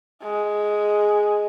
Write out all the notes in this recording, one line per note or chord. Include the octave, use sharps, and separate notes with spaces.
G#3